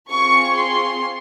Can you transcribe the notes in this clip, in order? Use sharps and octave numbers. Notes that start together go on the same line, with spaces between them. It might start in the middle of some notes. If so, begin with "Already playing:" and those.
C4 F4 G#4 C#6
C6